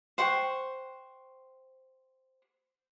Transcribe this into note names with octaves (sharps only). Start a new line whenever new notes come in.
C5 F#5 G5 C#6